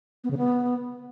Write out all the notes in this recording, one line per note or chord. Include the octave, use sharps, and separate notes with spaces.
B3
C#3
B3